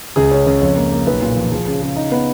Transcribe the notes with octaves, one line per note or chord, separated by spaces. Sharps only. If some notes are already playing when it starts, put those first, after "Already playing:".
C#2 G#4
C#4
C#2
F2 C#5
A#3
A#3
B1 B4
A#2
F3
F3 G#4
C#3
C#3
D#4
B3